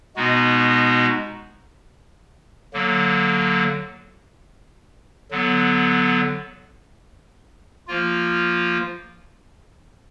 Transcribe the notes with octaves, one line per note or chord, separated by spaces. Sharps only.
B2 G#3 B3 D#4 F#4
D3 F#3 A#3
D3 F#3 B3
F3 A#3 F4